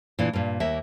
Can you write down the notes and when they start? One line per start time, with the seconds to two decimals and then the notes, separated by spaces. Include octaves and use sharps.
0.19 A#2 E3 D4
0.33 G2 A#2
0.60 D#2 A#3 E5